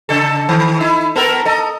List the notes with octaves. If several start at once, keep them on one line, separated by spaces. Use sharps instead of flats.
C#3 A4
D#3
D#4 E4
B3 A4 A#4
A4 D#5